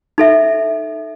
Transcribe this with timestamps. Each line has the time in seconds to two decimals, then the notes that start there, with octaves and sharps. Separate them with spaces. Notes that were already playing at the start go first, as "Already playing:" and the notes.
0.18 D#4 A4 E5